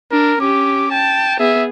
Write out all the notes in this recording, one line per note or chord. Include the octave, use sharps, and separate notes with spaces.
D4 A#4
C#4 G4 D6
G5 A5
B3 G#4 E5